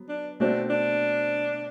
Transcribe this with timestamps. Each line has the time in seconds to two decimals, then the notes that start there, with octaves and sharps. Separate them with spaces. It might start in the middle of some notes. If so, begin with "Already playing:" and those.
Already playing: F#3 B3
0.09 D4
0.40 B2 A3 C4 D4 F#4
0.70 D4